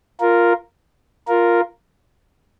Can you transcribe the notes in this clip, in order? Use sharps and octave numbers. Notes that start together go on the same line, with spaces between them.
F4 A#4
F4 A#4